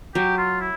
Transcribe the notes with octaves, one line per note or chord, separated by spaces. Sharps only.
F#3 G4
F4
E4